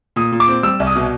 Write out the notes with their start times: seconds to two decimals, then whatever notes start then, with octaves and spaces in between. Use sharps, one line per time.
0.16 A#2 D#6
0.32 A#2
0.40 D6
0.48 C4
0.63 G3 E6
0.80 C2
0.87 D#6
0.96 B2